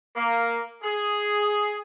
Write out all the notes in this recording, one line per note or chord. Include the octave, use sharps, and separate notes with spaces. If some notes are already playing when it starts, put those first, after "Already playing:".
A#3
G#4